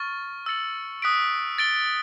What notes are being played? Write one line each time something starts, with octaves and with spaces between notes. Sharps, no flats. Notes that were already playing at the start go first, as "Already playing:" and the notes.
Already playing: C#6 F6 A6
E6 A6 C#7 F#7
D#6 F#6 B6 D7
A6 D7 G7